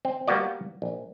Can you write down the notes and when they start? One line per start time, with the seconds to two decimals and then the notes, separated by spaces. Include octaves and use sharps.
0.05 C4
0.27 G3 A#3 B3 F#4 D5
0.82 A#1